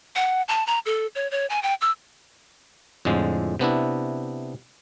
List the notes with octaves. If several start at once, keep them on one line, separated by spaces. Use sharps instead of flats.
F#5
A5
A#5
A4
C#5
C#5
G#5
G5
E6
F2 A2 D3 G#3
C3 B3 D4 E4